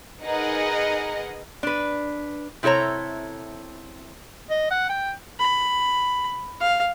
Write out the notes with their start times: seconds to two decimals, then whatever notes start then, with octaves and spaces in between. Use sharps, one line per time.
0.23 D#4 G#4 A#4 B4 D#5 F#5
1.63 D4 B4
2.63 C3 E4 A4 C#5 A#5
4.50 D#5
4.71 F#5
4.89 G5
5.39 B5
6.60 F5